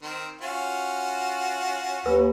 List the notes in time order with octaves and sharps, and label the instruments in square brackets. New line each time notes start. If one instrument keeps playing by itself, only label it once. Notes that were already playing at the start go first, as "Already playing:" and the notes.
[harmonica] D#3 C4
C#4 F4 F#4
[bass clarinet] D#2 [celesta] B4